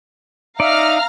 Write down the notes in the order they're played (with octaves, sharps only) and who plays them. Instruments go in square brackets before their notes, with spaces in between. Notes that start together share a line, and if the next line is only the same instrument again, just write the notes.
[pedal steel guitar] D#4 D5 [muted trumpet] E5 [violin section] F5 A#5 F6